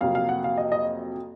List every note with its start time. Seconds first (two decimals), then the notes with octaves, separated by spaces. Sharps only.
0.01 F2 C3 F#3 A#3 F5
0.15 F5
0.29 F#5
0.44 F5
0.57 D#5
0.72 D#5